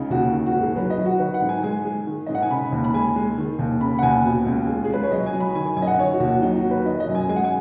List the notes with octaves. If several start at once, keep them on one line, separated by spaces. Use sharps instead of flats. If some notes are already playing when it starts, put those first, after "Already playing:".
Already playing: C#2 C#3 D#4
D#2 F#4
D#3
F#4
G#2
G#4
F#3 B4
D#5
F#3
F#4
D#3 B4
F#5
G#2
G#5
G#3 G#5
G#3
D#3
G#2 D#5
F#5
G#5
C#3 B5
D#2
B5
G#3 G#5
G#3
D#3
D#2
C#3 B5
F#5
D#2 G#5
B2
C#2
G#3
G#4
G#3 B4
C#5
F#3 D#5
G#5
F#3
B5
D#3 G#5
G#5
F#2 G#5
D#5
F#5
D#3 C#5
F#4
D#2
F#4
F#3 D#4
F#4
F#3
B4
D#3 D#5
D#5
F#2
G#5
G#3 G#5
F#5
G#5